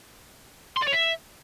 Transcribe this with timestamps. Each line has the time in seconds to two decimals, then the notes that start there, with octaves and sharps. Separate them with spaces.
0.77 C6
0.82 D5
0.88 C#5
0.93 E5